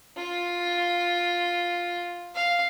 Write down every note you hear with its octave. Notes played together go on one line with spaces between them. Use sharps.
F4
F5